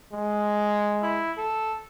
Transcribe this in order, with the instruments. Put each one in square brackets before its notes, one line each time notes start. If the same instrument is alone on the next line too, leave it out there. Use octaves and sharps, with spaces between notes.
[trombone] G#3
[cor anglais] E4
A4